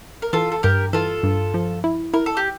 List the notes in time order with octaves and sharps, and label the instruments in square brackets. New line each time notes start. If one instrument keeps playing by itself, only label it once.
[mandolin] A#4
[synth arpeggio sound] E3 [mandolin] F4 A4
[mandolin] A4
[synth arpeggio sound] G2 [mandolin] G4 A#4
[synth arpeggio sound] E3 [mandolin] F4 A4
[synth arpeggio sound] G2
F3
E4
[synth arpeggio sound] E4 [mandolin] A#4
[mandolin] A4
G4